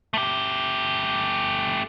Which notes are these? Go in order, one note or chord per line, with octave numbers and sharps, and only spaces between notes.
A3 G4